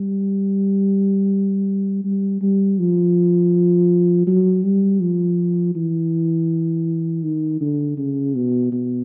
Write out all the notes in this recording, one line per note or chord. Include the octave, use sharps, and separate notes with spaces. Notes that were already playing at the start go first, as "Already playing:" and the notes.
Already playing: G3
G3
G3
F3
F#3
G3
F3
E3
D#3
D3
C#3
B2
B2